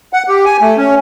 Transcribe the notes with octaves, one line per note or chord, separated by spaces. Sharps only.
F#5
G4
G#5
A3
C#4